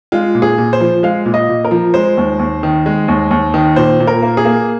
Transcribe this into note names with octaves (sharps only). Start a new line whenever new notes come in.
G#3 F4
A#2
G#4
A#2
C5
F3
G#3 F5
A#2
D#5
A#2
A#4
F3
G#3 C5
D#2
D#2
D#3
G#3
D#2
D#2
D#3
A#2 C5
A#2
A#4
A#3
G#4
A#3